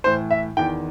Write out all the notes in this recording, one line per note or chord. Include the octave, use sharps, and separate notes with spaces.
A2 E3 C5
E5
E2 D#3 G5